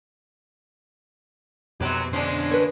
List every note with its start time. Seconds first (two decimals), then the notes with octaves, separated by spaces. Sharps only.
1.81 F2 G#2 B2 F#3 B3 G4 C5
2.13 D3 G#3 C#4 D4 C5
2.51 B4 C#5